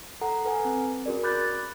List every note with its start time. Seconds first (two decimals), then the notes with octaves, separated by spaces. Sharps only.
0.21 A4 F#5 A#5
0.45 A4 B4 F#5 G#5
0.65 C4
1.06 C#4 F#4 G#4 A#4 D5
1.23 B5 D6 F#6 G6 A6
1.41 A6